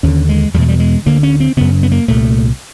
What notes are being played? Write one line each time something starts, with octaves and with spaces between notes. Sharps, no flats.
D#2 D3 C#4
G#3
E2 B2 G3 G#3
G3
G#3
D2 D3 A#3
C#4
C4
F#2 C#3 B3
B3
A#3
C2 A#2 A3